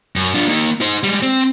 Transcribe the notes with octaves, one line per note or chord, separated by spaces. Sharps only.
F#2
D4 F4
A#3 D#4
D#4 C5
G3 G#3
C4